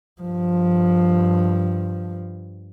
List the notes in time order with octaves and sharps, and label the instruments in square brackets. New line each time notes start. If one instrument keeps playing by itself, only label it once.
[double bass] G2 F3